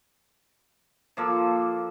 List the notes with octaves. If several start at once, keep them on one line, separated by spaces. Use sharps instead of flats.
F3 A#3 A4